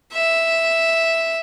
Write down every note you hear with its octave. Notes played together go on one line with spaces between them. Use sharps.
E5